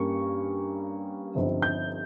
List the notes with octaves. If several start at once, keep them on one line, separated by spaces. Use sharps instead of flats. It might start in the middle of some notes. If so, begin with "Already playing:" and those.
Already playing: G2 G3 A#3 C#4 C#6
G1 G2 F3 C4 D#4
G6